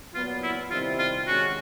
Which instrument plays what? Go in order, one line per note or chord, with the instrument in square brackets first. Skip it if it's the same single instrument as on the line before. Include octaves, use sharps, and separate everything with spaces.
[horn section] A#2 F#3 B3 [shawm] F4
[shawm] E4
[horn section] C3 D#3 G3 C4 E4 [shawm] F4
[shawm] F4
[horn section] D#3 G#3 C#4 [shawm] F#4